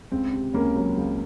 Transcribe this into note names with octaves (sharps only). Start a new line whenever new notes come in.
C#2 C4
C3
C#2 A#3 C#4
F#3
C#2